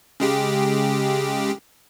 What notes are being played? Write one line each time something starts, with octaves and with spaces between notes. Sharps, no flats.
C#3 G#3 G4